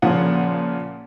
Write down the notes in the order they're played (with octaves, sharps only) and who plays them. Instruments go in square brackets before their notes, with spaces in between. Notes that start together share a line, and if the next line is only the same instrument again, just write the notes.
[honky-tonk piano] A#2 C#3 F3 F#5